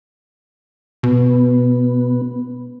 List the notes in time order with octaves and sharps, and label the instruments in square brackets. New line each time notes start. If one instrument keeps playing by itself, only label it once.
[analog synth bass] B2 [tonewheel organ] B3